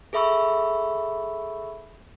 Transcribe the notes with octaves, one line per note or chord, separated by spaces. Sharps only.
G#4 A4 E5 B5 C#6 E6